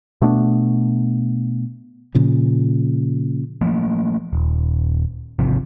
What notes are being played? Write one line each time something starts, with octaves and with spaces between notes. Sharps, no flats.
B2 A3 B3 D4
A#2 C#3 F3
F3 A3 A#3
D#1
G#1 C3 F3